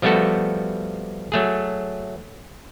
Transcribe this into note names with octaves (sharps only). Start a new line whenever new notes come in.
F3 G3 A3 B3 F#4 A4
F#3 A3 G#4